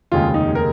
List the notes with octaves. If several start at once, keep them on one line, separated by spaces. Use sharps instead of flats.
F1 D#2 C#3 G#3 F4
D#4
A#4